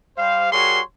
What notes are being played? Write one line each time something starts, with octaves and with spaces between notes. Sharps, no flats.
G3 C5 F5
G3 F#4 G#4 A#4 C#5 C6